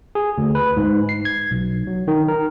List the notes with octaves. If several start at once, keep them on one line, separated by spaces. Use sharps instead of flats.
G#4
D2
B4
G#2
C7
G#6
B1
F#3
D#3
A#4